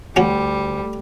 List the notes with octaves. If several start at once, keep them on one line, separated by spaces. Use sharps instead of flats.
D2 G3 C#4 F#4